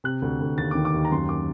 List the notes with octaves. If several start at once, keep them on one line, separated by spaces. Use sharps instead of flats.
C3 F#6
D2
D2
D#2 A6
D#3 D6
D6
D#2
A#5
F#2 C6
D6